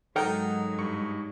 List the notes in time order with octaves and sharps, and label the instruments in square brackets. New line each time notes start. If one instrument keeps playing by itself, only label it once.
[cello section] G#2 F#3 G#3 [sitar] D#4 [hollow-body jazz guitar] A4 A#4 G5 [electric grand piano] F#5
[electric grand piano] G2 C#6 C#7